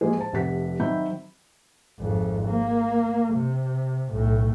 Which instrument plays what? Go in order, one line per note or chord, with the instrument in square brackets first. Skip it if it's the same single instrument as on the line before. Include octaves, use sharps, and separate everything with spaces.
[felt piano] F3 G#3 A#3 G#4
C5 A5
F1 C3 F#5 B6
D#3 F#3 C4 E5 B5 G6
[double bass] G#1 F2
A#3
C3
B1 A2